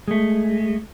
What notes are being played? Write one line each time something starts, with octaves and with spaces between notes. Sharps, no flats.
G#3 A3